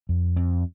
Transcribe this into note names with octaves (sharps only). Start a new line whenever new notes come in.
F2
F2